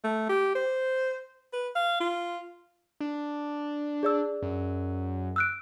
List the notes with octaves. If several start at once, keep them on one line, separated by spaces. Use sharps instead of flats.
A3
G4
C5
B4
F5
F4
D4
G#4 D5 E6
F#2
E6 F#6 D7